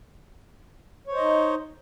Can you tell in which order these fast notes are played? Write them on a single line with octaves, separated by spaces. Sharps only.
C#5 C5 D#5 D#4